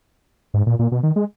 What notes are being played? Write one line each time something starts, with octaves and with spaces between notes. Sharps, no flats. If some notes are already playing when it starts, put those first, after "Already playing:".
G#2
A#2
A#2
B2
D#3
G#3